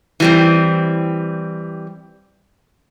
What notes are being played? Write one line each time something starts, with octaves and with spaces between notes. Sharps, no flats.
E3 G3 C4